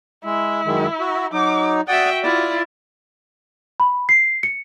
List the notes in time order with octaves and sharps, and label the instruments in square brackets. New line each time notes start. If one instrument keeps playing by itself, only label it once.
[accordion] G#3 [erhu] E4
[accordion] F#2 D#3 G#3
F#4
[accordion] F#3 D#4 [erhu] D6
[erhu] F#4 [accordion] D5 F#5 D#6 [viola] E5 G5
[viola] E4 F4 [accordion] D5
[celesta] B5
C7
C#7